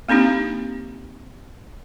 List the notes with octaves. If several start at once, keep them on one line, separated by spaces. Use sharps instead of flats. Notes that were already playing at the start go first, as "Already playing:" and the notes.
A#3 C4 D4 D#4 G4